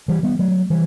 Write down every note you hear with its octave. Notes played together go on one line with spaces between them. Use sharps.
E3 G3
G3 B3
F#3 A3
E3 G3